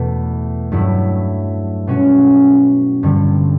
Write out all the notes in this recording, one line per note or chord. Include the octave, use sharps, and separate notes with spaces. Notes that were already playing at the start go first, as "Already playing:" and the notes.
Already playing: E2 B2 A3 E4
G2 F#3 A3 E4
B2 G3 C#4 F#4
G2 D3 G3